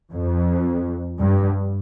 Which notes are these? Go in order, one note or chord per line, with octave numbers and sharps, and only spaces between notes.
F2
G2